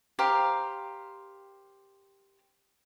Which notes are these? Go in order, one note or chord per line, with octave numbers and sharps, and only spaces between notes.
G4 A#4 C5 F5